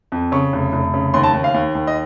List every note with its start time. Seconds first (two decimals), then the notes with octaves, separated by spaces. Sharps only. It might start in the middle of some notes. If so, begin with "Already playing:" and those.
0.12 F2
0.32 C#3 C#6
0.53 F1
0.73 F1
0.94 C#3
1.14 D#2 C6
1.24 A5
1.34 D#2
1.44 F5
1.54 D#2
1.75 D#2
1.87 D#5